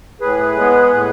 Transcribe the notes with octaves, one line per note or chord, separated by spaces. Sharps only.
A2 G#4 B4
G#3 B3
A2